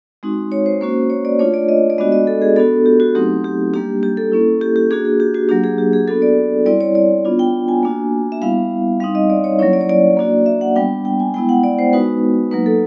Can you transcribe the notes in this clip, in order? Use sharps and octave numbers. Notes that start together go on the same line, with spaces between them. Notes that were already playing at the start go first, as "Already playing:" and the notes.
G#3 C4 D#4 F#4
C#5
C5
A#3 C#4 F#4 C5
C#5
D5
A3 D4 F4 C#5
D5
D#5
D5
G#3 B3 D4 F#4 D#5
D#5
A4
G#4
B3 D4 F#4 A4
G4
F#4
F#3 A3 C4 D#4 G4
G4
G3 A#3 D4 G4
G4
A4
A#3 C#4 E4
G4
G4
A#3 D4 F#4 G#4
G#4
G4
F#4
F#3 A#3 D4 G4
G#4
G4
G#4
B3 D4 F#4 A4
D5
G3 C4 E4 D5
C#5
D5
B3 D4 F4
G5
G#5
A#3 D4 F#4
E5
G3 B3 E4 F5
G3 C4 D#4 F5
D#5
D5
C#5
F#3 A#3 C#4 E4 C#5
D5
C#5
D5
A#3 D4 F#4
E5
F#5
G3 B3 D4 G5
G5
G#5
G#3 B3 E4 G5
F#5
D5
C5
G#3 B3 D#4 F#4 B4
F#3 A#3 D#4 B4
A4